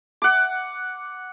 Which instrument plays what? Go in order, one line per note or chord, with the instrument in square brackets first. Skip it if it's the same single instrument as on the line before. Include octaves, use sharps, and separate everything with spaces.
[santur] F#5 D6